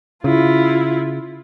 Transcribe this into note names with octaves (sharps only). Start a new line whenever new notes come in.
C#3 E4 F4